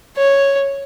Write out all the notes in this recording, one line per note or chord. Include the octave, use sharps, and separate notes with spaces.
C#5